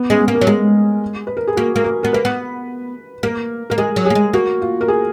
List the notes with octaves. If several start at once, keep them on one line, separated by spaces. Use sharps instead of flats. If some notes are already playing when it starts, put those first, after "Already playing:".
Already playing: B3
G#3 C#4
B3
A#3
A#4
F#3
G#3 G#4
B4
A#4
G#4
A#3 F#4
A#3
A#4
B3 A#4
A#3 B4
B3
A#3 A#4
A#3 A#4
G#3 G#4
F#3
A#3 G#4
G#3
A#3 F#4
F4
A#4
G#4